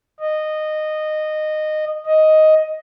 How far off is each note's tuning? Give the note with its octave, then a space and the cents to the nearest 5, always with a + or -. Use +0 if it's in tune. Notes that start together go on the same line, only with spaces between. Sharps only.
D#5 -15
D#5 +5